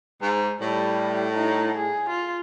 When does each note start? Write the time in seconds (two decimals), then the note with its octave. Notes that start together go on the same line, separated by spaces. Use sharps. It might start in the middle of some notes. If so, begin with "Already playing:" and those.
0.22 G#2
0.61 A2 G3
1.34 D#4
1.77 G#4
2.10 F4